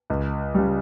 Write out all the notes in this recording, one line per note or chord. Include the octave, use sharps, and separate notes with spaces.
C#2
C#3 G3